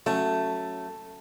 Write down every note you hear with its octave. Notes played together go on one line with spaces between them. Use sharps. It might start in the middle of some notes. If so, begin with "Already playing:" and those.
F#3 A3 C#4